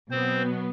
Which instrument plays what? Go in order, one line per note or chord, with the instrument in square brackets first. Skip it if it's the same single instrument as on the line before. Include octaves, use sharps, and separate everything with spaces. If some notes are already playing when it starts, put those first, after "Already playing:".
[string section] B2 F#3 B3 [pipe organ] C4 C5